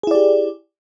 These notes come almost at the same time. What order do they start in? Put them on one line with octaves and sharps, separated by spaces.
G#4 E4 D5 G4